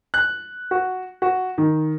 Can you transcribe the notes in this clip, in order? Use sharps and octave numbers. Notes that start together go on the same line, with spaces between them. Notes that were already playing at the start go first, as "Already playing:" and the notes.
F#6
F#4
F#4
D#3